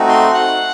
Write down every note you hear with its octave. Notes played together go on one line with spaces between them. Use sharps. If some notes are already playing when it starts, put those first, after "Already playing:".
Already playing: A3 C4 D#4 F#4
C6
F#5